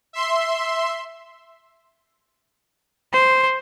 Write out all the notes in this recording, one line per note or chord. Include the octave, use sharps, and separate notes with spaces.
E5 C6
C5